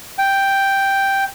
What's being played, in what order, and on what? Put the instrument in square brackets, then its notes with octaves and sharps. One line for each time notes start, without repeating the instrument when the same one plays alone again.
[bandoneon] G5